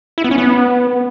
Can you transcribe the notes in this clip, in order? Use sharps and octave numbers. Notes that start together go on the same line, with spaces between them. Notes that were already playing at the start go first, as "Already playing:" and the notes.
E4
B3
C#4
B3